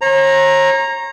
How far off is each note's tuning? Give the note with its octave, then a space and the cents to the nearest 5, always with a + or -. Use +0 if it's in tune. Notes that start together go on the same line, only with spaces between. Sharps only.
C#5 -40 A#5 +0